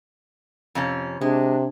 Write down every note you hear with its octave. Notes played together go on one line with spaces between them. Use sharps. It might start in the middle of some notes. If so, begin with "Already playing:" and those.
F2 C3 C#4
C3 G#3 D4